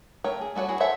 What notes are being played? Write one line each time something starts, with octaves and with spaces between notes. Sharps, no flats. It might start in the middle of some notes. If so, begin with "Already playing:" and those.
A3 A#4 C#5 G5
G#4
G3 A3 F#4 C#5
E4 F#4 G#4
A4 C5 C#5 E5 F#5